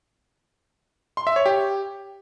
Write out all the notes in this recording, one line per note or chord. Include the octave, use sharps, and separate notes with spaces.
C6
E5
C#5
G4